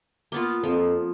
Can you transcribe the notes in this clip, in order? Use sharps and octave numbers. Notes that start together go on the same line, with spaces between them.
A#3 B3 F4
F2 F3